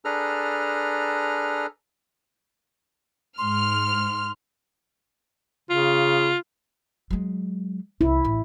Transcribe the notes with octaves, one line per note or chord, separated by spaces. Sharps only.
D4 G#4 A4 B4 A#5 F6
G#2 C6 F6
C#3 F4
F#3 G#3
C2 E4
A1